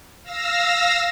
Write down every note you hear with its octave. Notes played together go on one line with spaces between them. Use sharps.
F5 E6 A#6